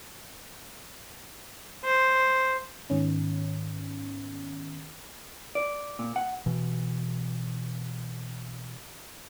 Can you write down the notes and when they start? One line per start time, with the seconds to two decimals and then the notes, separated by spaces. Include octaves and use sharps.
1.84 C5
2.90 G#2 D#3 B3 C#4
5.55 D5
5.99 A#2
6.16 F#5
6.46 B2 E3